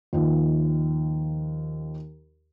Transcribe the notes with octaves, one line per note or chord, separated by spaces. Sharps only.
D#2 F3